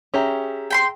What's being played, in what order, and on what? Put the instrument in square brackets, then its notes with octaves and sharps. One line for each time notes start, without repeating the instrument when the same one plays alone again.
[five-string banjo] C#4 G4 [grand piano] G#4 E5 A#5
[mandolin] G5 B5 C6